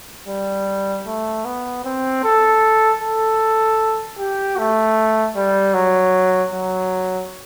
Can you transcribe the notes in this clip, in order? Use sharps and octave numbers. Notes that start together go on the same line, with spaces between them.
G3
A3
B3
C4
A4
A4
G4
A3
G3
F#3
F#3